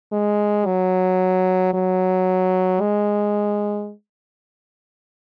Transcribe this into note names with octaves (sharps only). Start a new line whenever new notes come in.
G#3
F#3
F#3
G#3